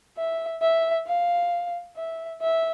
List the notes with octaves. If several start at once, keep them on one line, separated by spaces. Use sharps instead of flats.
E5
E5
F5
E5
E5